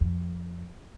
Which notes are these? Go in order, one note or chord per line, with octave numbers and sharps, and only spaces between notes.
F2